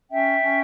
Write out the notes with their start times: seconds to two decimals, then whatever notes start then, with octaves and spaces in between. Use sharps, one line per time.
0.09 C#4 E5 G5
0.41 C#4